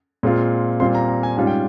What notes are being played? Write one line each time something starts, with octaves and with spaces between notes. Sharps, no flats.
A#2 G#3 C4 F4
A#2 G3 C4 F4 C6
A#5
A#5
G#5
G#2 G3 C#4 F4 G#5
G5